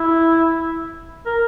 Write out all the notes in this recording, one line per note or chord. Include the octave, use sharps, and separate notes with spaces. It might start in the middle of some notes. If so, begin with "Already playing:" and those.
Already playing: E4
A#4